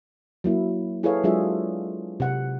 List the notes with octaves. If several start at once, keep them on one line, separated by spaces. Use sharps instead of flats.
F#3 A#3 E4
E4 G#4 A4 B4 C#5 F5
F#3 G#3 D4 F4 G#4 E5
C3 F#5